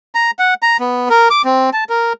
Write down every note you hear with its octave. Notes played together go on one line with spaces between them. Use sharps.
A#5
F#5
A#5
B3
A#4
D6
C4
A5
A#4